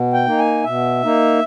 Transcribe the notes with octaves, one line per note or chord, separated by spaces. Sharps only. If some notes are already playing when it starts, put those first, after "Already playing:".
Already playing: B2
G5
A#3 D#4
G#5
B2 E5
A#3 D#4